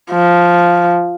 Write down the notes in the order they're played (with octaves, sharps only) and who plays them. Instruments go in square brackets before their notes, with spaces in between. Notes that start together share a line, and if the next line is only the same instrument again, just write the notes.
[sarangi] F3